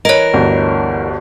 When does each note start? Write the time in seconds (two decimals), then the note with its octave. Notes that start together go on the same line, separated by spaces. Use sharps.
0.05 E3 A#4 C#5 D#5
0.34 G1 D2 G2